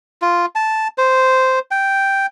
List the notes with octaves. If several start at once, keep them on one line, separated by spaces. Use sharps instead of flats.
F4
A5
C5
G5